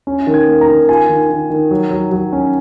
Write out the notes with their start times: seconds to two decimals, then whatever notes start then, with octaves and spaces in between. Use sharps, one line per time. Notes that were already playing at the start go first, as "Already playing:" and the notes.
0.07 C#4
0.27 D#3
0.34 G#6
0.48 A#3
0.61 A#5
0.68 D#3
0.89 F4 G#5
1.09 D#3
1.30 D#3
1.50 D#3
1.71 F#3
1.91 F#3
2.12 F#3
2.33 C#4